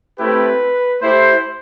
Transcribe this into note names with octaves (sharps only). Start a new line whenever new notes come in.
A3 C4 E4 G4 B4
A3 E4 G4 C5